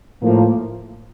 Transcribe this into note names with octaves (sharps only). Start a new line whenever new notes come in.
A2 F3 A#3